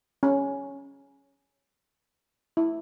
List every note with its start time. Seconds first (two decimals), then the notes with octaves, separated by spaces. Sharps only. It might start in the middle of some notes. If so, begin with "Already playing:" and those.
0.23 C#4
2.57 E4